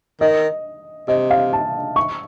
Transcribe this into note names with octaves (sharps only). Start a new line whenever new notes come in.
D#3 D#5
C3 D#5
F5
A5
C#6